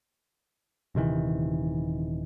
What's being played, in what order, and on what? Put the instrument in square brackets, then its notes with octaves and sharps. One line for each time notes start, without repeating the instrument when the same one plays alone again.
[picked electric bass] D#1 C3 D#3 E3